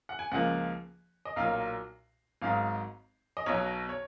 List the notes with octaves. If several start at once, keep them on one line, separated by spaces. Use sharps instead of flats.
F#5
G#5
C#2 C#3 F3 A#3 F#5
D#5
B1 A#2 F#3 F5
G#1 G#2 F#3 F5
D#5
B1 B2 F#3 C#5
C#5